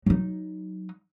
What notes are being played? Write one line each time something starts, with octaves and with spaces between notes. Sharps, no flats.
F#3 D#4